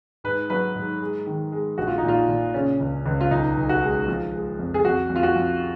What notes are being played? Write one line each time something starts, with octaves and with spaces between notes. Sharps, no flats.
G#2 B4
F#3 B4
G#2
G#3
D#3
G#3
A#1 F#4
F4
D#4
A#2 F4
A#2
C#3 C#4
C#2
C#2
F4
B1 D#4
B1
F#4
G#3
F3
G#3
F2
G#4
F2 F#4
F2
F4
F#4
F2